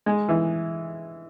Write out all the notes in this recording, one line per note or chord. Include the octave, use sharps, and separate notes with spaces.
G#3
E3